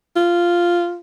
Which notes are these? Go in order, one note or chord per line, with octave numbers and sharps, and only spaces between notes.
F4